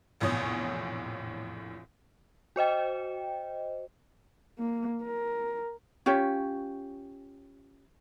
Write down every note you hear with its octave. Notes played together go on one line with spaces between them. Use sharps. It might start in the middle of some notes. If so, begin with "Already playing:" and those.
F1 A#1 E2 A2 C#5 D#6
F#4 C5 D#5 G5
A#3
A#4
C#4 F4 G4 C#5